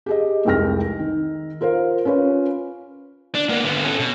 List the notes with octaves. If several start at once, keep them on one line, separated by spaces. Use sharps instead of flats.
G4 G#4 D#5
F1 C2 G#3 G5 F6 A#6
D#3
F4 A#4 C5 F5
C#4 F4 B4 C#5
D4
A#3 B3
D3 B3
C#4 A4
B2